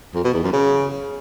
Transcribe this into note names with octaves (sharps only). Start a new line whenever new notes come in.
F2
B2
E2
F#2
C#3